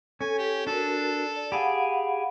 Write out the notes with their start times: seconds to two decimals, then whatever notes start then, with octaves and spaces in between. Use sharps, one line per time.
0.21 C#4 A4 G#5
0.38 G4
0.67 D4 F#4 A4 A#4
1.36 D5
1.52 G4 G#4 F5 F#5 B5